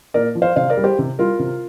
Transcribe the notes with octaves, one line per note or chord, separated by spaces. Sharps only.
A#2 A#4 D5
F3
C5 F5
C3 C5 F5
A#4 D5
G3
G4 C5
C3
G3 F4 A#4
C3